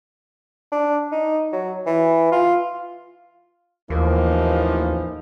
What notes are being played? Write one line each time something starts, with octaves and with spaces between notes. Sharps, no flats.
D4
D#4
F#3
E3
F4
A1 D#2 E3 F3 A#3 D#4